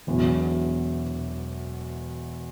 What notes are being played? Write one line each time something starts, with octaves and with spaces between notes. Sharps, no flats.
E1 E2 B2 F#3 E4